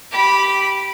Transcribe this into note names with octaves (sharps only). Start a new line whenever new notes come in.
G4 B5